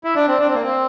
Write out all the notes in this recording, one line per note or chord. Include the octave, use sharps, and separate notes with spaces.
E4
D4
C4
D4
C4
A#3
C4